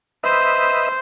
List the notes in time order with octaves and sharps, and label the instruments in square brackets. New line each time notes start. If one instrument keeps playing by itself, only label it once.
[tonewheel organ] B4 D#5 E5 [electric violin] C5